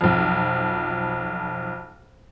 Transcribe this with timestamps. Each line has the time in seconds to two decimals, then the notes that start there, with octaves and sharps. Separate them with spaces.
0.01 B1 F2